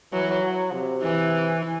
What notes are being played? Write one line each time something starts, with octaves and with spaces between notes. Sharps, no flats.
E3 F#3
F#3
C3
E3